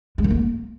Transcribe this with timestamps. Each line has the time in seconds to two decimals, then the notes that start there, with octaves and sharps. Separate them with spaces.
0.18 G#3
0.24 D#3
0.30 A#3